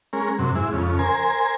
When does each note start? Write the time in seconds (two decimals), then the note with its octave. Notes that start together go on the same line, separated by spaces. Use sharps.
0.13 G#3 C#4 A#4
0.39 F#2 C3
0.55 G#2 E4
0.73 F2 C#3
0.99 A#4 C5 G#5